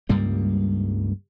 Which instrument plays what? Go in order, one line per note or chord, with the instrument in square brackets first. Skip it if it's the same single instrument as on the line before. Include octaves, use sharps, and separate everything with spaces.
[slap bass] C#2 G2 G3 A#3